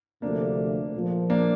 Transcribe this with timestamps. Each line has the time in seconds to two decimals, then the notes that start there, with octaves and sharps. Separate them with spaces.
0.22 D2 C3 F3 A3 A#3 D4
0.94 A#1 A#2 F3
1.30 A#3 D4